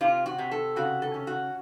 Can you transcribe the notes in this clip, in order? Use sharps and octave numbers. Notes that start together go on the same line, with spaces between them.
C3 F4
F#4
C3
A4
C#3 F#4
A4
C#4
F#4